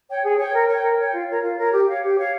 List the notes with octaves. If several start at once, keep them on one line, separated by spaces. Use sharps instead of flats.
C#5 G5
G#4
C#5 G5
A#4
C#5 G5
A#4
C#5 G5
F4
A#4 C#5
F4
A#4 C#5
G4
C#5 F5
G4
C#5 F5